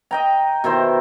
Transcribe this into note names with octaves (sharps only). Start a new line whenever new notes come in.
D#5 G5 A#5
B2 D#3 E4 C5